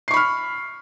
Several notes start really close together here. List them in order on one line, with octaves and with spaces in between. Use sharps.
C7 C#6 B5 F6